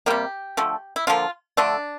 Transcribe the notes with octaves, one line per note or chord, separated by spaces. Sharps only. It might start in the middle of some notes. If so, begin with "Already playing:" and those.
C3 G3 A#3 G4
D3 F3 A3
E4
D3 F3 A#3 F4
D3 F3 A3 D4